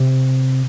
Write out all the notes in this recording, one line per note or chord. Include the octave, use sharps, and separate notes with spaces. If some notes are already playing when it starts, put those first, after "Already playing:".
Already playing: C3